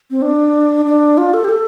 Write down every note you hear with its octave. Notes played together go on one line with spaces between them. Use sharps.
C4
D4
D4
F4
A4
G4
A4